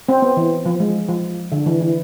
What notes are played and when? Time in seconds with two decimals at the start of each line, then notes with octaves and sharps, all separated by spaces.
0.09 C4
0.22 B3
0.37 E3
0.66 F3
0.80 G#3
1.08 F3
1.52 D3
1.66 E3
1.80 E3